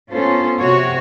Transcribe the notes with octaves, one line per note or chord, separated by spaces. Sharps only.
B3 C#4 F4 A4 C5
C3 F#4 C#5